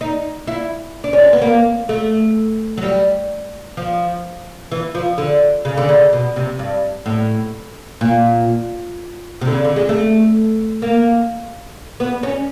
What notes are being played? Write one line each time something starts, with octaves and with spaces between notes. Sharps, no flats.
D#4
E4
D4
C#4
C4
B3
A#3
A3
F#3
G3
F3
E3
F3
D3
C#3
D3
C#3
B2
C3
G2
A2
A#2
C3
D3
C#3
D3
G#3
A3
A#3
B3
C#4